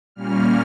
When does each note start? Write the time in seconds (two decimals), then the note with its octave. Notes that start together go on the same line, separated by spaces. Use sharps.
0.15 A#2 G3 A#3 C#4 F6